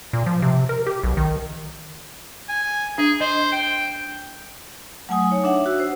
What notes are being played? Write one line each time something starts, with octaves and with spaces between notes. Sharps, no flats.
A#2
F3
C3
A#4
G4
B1
D#3
G#5
D4 G#4
C5 D#5
G5
F#3 A3 F#5 G#5 D#6
D#4 C#5
D4 E5 F#5
F#4 E6
C5